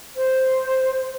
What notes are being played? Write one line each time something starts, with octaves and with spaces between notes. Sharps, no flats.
C5